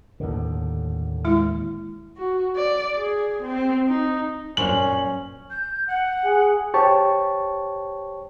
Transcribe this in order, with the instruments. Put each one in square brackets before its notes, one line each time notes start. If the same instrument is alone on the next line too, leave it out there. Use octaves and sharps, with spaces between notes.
[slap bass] D#2 A2 D3
[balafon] G#3 E4
[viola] F#4
D5
G#4
C4
D#4
[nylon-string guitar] F#2 A#2 C5 [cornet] C#4 [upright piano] F#7
[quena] G6
F#5
[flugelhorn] G#4
[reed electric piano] G4 C5 C#5 A5 C#6